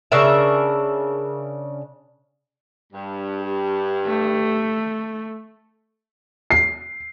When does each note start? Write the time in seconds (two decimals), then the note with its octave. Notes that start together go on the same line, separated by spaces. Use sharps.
0.12 C#3 D4 A#4 E5
2.92 G2
3.42 G4
4.07 A3
6.50 C7